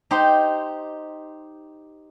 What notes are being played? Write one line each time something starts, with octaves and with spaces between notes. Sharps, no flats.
D#4 G4 C5